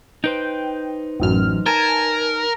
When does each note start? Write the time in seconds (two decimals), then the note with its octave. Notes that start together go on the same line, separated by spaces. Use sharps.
0.24 D#4 B4 C5 G5
1.20 A1 F#2 F6
1.66 A#4 G#5 A5